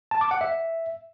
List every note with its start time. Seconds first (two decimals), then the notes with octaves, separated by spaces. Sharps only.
0.11 A5
0.21 D6
0.31 F#5
0.41 E5